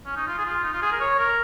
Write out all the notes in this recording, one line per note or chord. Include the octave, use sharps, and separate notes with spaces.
C#4
D#4
F4
G#4
F4
D#4
F4
G#4
A#4
C#5
A#4